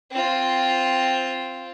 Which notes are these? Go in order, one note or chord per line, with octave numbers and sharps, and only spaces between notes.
C4 F4